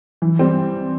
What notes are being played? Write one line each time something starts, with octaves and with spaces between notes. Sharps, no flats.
E3
G3 C4